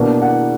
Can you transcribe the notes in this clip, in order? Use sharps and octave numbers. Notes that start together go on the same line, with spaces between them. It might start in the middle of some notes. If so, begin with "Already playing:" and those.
Already playing: B2 A#3 D4
F#5